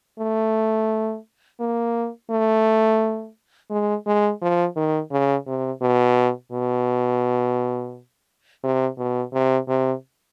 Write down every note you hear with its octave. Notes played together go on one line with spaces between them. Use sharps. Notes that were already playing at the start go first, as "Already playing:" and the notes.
A3
A#3
A3
G#3
G#3
F3
D#3
C#3
C3
B2
B2
C3
B2
C3
C3